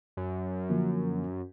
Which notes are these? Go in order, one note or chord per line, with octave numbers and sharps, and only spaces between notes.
F#2
D3 F3 A#3